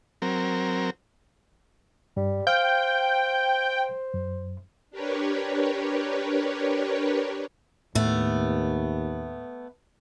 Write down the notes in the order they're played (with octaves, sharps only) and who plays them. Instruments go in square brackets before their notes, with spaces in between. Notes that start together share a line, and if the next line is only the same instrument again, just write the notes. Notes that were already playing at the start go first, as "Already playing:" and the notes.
[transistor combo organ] F#3 C4 A#4
[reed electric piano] G2 [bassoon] G3
[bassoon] C5 [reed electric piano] F5 F6 [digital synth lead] G5
[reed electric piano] F#2
[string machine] D4 G4 A#4 B4 C#5
[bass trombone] D#2 [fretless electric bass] A2 [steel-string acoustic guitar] A3 B3